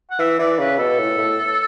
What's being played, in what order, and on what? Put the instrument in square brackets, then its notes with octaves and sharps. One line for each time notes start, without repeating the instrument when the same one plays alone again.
[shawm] F#5
[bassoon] E3 [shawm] E5
[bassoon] E3 [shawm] D5
[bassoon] C#3 [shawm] B4
[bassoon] B2 [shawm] A4
[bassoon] A2
A2